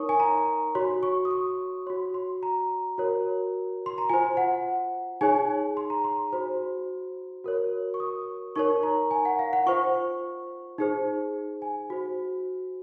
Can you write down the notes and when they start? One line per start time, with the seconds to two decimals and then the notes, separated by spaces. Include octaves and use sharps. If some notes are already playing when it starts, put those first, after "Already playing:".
Already playing: D#4 A#4 C#5 C#6 D#6
0.09 G#5
0.20 A#5
0.75 F#4 C#5 C6
1.03 C#6
1.25 D#6
1.31 C#6
1.87 F#4 C#5 C6
2.14 C6
2.43 A#5
2.98 F#4 A#4 C#5
3.86 C6
3.98 A#5
4.09 F4 C5 G#5
4.37 F#5
5.21 D#4 G#4 C#5 G#5
5.77 C6
5.90 A#5
6.04 C6
6.33 F#4 C5
7.44 F#4 A#4 C#5
7.94 C#6
8.00 D#6
8.56 D#4 A#4 C#5 C#6
8.83 A#5
9.11 G#5
9.25 F#5
9.39 F5
9.53 F#5
9.66 F4 C5 C#6
10.78 D#4 G#4 C5
11.62 G#5
11.90 F#4 C5